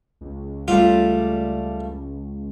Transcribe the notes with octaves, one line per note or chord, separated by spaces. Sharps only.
C#2
G3 A3 F4 D5